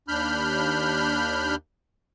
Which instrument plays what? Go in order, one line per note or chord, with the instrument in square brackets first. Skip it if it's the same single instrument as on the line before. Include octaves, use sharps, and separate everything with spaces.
[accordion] D#2 D4 B5 F6 G6